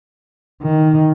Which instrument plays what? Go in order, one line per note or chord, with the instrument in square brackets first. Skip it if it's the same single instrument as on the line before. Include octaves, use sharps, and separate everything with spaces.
[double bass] D#3